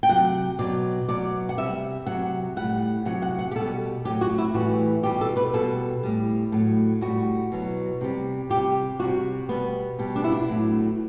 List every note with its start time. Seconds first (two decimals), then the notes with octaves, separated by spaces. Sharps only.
0.03 G5
0.09 C3 F#3 F#5
0.59 B2 F#3 D5
1.08 B2 F#3 D5
1.49 F#5
1.57 C3 G3 E5
2.06 C3 F#3 F#5
2.56 A2 G3 F#5
3.05 C3 F#3 F#5
3.22 F#5
3.39 F#5
3.51 G4
3.55 B2 G3 A4
4.05 A2 F#3 G4
4.21 F#4
4.38 E4
4.54 A2 E3 G3 F#4
5.03 B2 G3 G4
5.21 A4
5.37 B4
5.53 B2 G3 A4
6.03 A2 G3
6.52 A2 F#3
7.01 A2 G3 F#4
7.52 B2 F#3
8.01 C3 G3
8.50 C3 G3 G4
9.00 C3 G3 F#4
9.49 B2 G3 B3
9.99 B2 G3
10.16 D4
10.24 E4
10.32 D4
10.49 A2 F#3